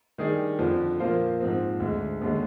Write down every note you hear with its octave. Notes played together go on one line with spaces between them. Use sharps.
D#3 G3 D4 G#4 D5
F2 D3 F3
A#2 F3 A#3 F4 C5
G#2 F3 C4
D2 D3 G#3
D#2 D3 G#3